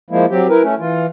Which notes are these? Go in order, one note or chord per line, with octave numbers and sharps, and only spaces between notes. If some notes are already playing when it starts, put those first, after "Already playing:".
F3 G#3 A#3 E4
F#3 C4 G4
E4 A#4 B4
A3 C#4
E3 F4